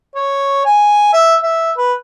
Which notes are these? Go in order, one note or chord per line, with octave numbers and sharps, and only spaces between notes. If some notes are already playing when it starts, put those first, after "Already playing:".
C#5
G#5
E5
E5
B4